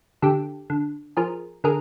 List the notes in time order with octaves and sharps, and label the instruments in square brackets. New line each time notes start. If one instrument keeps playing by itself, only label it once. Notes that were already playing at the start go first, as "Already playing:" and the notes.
[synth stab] D3 G4 A4
D3
F3 G#4 A#4
D3 G#4 A#4